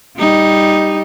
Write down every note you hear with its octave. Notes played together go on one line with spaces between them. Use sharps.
G3 D#4